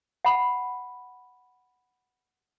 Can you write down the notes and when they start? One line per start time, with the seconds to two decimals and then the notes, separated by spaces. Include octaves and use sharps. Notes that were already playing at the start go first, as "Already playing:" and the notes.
0.25 F#5 B5